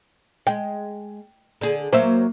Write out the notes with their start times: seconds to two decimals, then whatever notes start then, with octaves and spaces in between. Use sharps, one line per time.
0.47 G#3 G5
1.61 D3 G#4
1.93 F#3 A#3 C5 E5